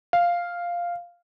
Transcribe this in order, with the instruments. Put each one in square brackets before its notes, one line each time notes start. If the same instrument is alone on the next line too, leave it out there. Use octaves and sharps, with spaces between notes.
[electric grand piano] F5